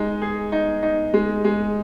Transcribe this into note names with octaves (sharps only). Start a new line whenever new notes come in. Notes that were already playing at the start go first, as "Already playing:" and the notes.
Already playing: G#3 D#4
G#4
D#4
D#4
G#3
G#3